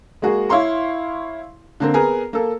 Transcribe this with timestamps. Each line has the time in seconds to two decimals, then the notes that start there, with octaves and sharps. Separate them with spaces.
0.22 G#3 A#3 F#4 G#4
0.49 E4 C#5 F5 C6 C#6
1.80 D3 A#3 C4
1.94 B3 G#4 A#4 G#5 A#5
2.33 A#3 A4